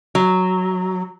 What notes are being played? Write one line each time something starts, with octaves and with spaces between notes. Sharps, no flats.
F#3